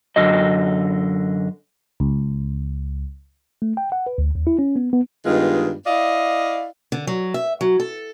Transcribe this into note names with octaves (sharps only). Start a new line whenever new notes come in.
F#2 D3 F#4 D#5
C#2
A3
G5
F#5
B4
D2
D#2
E4
C#4
B3
B3
G2 D#3 G#3 B3 F4
E4 D5 D#5 F5
D3
F#3
E5
F#3
A4